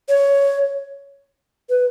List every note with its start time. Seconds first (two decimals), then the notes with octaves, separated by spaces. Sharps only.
0.09 C#5
1.69 B4